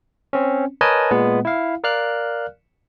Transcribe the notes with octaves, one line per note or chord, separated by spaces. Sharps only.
C4 C#4
A#4 B4 C#5 D#5 G#5 A5
A#2 G#3 B3
E4 F5
A#4 D5 F5 F6 F#6